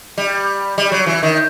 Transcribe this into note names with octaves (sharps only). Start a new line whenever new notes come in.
G3
G3
F#3
E3
D#3